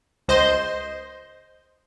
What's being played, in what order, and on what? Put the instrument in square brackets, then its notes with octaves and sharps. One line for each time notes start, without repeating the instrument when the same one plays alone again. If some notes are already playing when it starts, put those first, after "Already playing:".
[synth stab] C#2 C5 D#5 C6